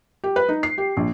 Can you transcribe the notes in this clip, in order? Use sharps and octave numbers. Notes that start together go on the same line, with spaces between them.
G4
B4
D#4
C7
G4
A#1